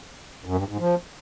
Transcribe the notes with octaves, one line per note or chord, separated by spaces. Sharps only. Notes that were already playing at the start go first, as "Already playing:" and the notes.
F#2
G2
G#2
F3